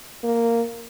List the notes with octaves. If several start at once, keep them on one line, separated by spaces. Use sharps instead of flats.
A#3